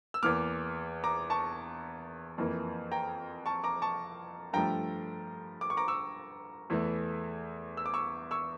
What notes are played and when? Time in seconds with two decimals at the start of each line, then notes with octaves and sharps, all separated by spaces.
0.14 E6
0.23 E2 E3 A#3 D6 F6
1.04 A#5 D6
1.30 A5 C#6
2.38 F2 E3 A#3
2.92 G5 A#5
3.46 A5 C#6
3.64 A#5 D6
3.82 A5 C#6
4.53 G2 F3 A3 G5 A#5
5.61 D6
5.70 C#6
5.77 A#5 D6
5.88 C#6 E6
6.70 E2 E3 A3
7.77 E6
7.86 D6
7.94 C#6 E6
8.31 C#6 E6